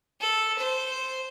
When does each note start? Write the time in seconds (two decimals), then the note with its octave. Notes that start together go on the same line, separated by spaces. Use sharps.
0.21 A4
0.58 C5